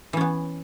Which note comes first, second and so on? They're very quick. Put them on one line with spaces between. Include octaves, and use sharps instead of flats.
E3 C#4 B3